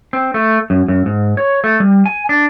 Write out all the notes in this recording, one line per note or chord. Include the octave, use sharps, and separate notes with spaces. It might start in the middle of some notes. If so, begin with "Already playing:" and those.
C4
A3
F#2
F#2
G#2
C#5
A3
G3
G#5
D4